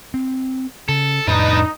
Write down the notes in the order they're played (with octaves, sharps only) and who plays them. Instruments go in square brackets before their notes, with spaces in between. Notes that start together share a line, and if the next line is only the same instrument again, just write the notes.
[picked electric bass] C4
[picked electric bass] C#3 [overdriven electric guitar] A4
[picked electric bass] F2 A2 [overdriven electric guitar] D4 B4 [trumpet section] D#4